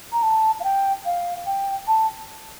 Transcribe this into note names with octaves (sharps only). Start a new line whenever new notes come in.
A#5
A5
F5
G5
F5
G5
A5